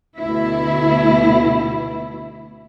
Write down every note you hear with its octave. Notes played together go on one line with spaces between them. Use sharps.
D2 B2 E4